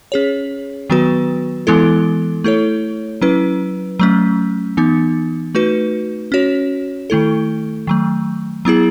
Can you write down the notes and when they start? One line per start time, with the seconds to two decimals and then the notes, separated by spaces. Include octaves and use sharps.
0.12 C#4 G#4 C#5
0.90 D#3 F#3 B3 F#4 B4
1.67 E3 G#3 B3 E4 A4
2.44 A3 E4 A4 C#5
3.22 F#3 C#4 E4 B4
3.99 F#3 A3 C#4
4.77 E3 B3 D#4
5.55 A3 D#4 F#4 B4
6.32 C#4 F#4 C#5
7.10 D#3 A3 E4 A4
7.87 D#3 F#3 A3
8.65 F#3 B3 E4 G#4